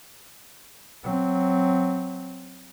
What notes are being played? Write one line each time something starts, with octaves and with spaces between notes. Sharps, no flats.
F#3 C4